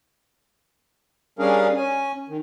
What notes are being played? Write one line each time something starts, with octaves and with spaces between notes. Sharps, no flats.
G3 C#4 D4 G#4 A#4 F5
C#4 G#5
D#3